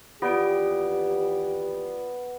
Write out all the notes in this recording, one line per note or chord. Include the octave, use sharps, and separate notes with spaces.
D#2 E3 B3 F4 G4 D5 D7